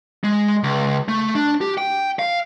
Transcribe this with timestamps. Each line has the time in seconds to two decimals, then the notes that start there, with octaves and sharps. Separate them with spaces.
0.24 G#3
0.63 C#2
1.08 A3
1.35 D4
1.61 G4
1.78 G5
2.19 F5